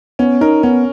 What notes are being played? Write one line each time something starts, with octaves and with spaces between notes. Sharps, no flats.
B3 C#4
D#4 A#4
B3 C#4